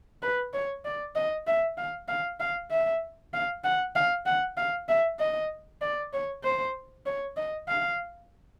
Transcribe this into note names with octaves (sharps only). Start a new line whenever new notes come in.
B4
C#5
D5
D#5
E5
F5
F5
F5
E5
F5
F#5
F5
F#5
F5
E5
D#5
D5
C#5
C5
C#5
D#5
F5